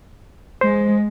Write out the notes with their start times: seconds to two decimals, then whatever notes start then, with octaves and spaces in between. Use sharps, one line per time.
0.61 G#3 C5